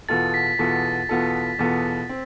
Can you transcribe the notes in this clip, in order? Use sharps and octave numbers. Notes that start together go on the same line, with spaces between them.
E2 B2 B3 F4 A4 A6
B6
E2 B2 B3 F4 A4
E2 B2 B3 F4 A4
E2 B2 B3 F4 A4
C4